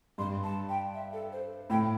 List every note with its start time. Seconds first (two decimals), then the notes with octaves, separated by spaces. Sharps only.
0.18 G2 C6
0.44 A5
0.69 G5
0.94 E5
1.13 A4
1.32 C5
1.70 A2 G5